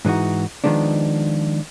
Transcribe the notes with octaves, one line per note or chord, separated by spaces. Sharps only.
G#2 E3 D#4 F#4
D#3 F3 G#3 B3 D4